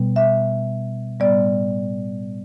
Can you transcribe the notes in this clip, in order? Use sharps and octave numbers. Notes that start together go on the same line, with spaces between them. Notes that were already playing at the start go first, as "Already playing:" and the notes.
Already playing: B2 G3 B3
E5
A2 G3 B3 D5